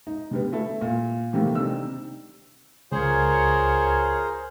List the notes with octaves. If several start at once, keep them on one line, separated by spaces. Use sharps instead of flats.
D#4
D3 G3 B3
A3 E4 A4
A#2
C3 D#3 E3 A3 A#3
C3 G3 D4 D#4 E6
C#2 F4 G#4 A#4 C5 C#5